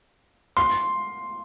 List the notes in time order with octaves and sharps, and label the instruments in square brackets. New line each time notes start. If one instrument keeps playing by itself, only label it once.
[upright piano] C6